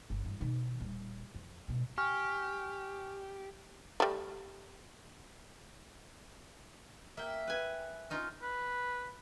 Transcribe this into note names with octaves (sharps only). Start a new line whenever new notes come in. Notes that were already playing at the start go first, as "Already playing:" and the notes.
G1
E2 G2
B2 D#3
D#1 G3
F2
G#2 B2
G4 G#5 C#6 F6
G3 A3
A#3 E5 G5
B4 G#5
C#4 D#4 F4
B4